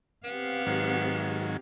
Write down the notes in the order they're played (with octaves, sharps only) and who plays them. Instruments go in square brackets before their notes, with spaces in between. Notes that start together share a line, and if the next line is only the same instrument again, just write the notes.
[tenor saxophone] B3 [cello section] C4 G4 F5
[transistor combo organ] G#2 D#3 F#3